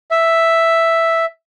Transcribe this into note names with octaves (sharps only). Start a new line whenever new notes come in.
E5